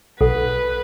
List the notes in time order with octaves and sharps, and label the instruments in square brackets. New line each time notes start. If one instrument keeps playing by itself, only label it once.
[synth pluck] B1 [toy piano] A4 F#5 [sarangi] B4